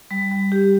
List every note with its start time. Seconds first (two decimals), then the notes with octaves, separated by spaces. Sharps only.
0.11 G3
0.32 G3
0.52 G4